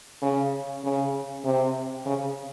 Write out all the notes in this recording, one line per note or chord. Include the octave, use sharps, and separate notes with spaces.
C#3
C#3
C3
C#3